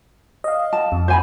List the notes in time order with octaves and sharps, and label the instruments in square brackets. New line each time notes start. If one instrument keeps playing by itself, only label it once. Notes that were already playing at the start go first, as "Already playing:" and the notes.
[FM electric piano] D#5 F5
[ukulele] A5
[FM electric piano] F2
[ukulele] C5 G#5 B5